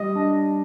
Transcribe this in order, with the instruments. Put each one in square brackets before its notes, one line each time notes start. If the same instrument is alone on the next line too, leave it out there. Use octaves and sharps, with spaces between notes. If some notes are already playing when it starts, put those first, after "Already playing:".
Already playing: [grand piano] G3 [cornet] D#5
[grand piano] D4